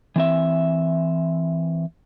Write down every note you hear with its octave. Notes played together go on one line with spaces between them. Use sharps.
E3 C4 E5